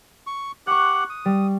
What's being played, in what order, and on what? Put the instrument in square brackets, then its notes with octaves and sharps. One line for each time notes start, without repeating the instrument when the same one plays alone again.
[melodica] C#6
[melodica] G4 F#5 [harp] C#6 F#6
[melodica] D#6
[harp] G3